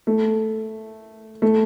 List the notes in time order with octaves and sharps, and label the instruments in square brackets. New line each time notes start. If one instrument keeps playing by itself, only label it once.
[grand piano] A3
A3